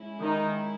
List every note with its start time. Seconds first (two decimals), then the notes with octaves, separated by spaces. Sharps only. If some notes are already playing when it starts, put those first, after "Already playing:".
Already playing: G#3 C#4 E4
0.21 D#3 D#4